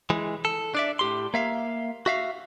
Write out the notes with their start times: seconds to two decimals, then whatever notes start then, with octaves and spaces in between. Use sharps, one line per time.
0.10 E3 G#3
0.45 A4
0.75 D4 D5 E5
0.99 A2 G4 C6
1.34 A#3 E5 F5
2.06 F#4 E5 F5